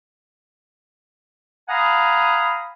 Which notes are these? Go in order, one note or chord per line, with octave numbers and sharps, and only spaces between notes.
F5 F#5 G#5 A#5 B5 D#6